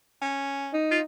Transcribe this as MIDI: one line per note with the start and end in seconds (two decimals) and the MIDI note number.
0.22 0.74 61
0.73 1.02 63
0.91 1.00 65